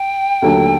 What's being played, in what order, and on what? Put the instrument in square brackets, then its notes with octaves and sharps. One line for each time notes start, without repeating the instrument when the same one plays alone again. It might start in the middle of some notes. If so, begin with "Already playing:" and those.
Already playing: [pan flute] G5
[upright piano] D#2 D3 F#3 A3